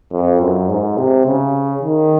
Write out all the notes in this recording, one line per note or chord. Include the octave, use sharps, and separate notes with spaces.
F2
F#2
G#2
C3
C#3
D#3